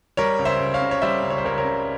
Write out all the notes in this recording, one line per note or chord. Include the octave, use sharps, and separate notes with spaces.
G3 A#4 C#5
C#2
C5 E5
C#2
C#5 F5
C#3
C#5
G3 C5 E5
C#2
C#5
C5
C#2 A#4 C#5
A#4 C#5
C#3